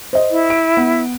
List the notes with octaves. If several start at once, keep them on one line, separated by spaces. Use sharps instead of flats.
C5 D#5
E4
D7
B3 F#5